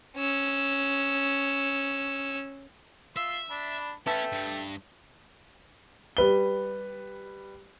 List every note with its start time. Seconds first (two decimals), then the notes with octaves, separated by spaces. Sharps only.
0.17 C#4 E6
3.16 F4 E5 C6 E6
3.50 D4 B5
4.07 A3 C#4 B4 E5 G5 A5
4.32 G2
6.17 G3 B4 G7